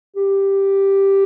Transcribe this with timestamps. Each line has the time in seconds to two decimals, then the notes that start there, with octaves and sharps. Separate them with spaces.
0.16 G4